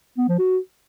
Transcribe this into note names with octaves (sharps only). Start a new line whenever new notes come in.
B3
F3
F#4